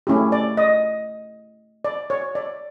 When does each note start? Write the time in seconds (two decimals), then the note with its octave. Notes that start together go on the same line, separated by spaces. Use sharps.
0.07 A3 C#4 E4 G4
0.32 D5
0.57 D#5
1.85 D5
2.10 C#5
2.35 D5